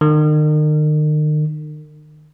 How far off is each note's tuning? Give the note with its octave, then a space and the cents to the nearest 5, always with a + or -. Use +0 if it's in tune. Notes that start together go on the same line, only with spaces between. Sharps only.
D#3 -40